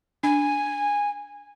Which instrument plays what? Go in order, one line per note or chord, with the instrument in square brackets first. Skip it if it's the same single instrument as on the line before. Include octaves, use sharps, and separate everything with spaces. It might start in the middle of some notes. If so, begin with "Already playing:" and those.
[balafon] D4 [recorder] G#5